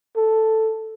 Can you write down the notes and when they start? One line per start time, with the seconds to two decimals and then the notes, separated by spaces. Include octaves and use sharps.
0.16 A4